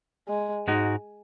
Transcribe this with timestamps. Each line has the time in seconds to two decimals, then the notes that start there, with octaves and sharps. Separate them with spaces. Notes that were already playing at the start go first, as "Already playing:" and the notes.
0.28 G#3
0.68 G#2 G#3 D#4 F#4